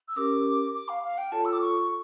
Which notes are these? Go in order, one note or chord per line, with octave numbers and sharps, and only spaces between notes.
E6
C#4 G4 A#4 D6
D6
F5
F5
G5
F4 A4 C#5 A5
E6
D6
C#6